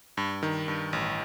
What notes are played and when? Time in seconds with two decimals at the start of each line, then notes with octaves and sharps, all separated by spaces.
0.17 G2
0.43 D#3
0.68 G2
0.93 A1